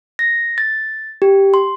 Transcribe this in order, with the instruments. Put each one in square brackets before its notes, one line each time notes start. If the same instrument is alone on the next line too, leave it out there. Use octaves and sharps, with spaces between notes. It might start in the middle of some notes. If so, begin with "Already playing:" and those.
[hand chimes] A#6
A6
G4
C6